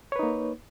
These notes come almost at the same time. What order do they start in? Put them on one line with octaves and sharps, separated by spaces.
C#5 B4 D#4 A#3